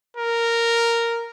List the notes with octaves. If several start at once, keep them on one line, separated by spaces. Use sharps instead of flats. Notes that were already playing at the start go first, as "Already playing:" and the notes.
A#4